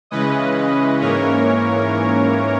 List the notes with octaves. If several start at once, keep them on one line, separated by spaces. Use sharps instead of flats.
C#3 E3 G#3 C#4 B4 D#5
G#2 E3 A#3 C#4 A#4 C#5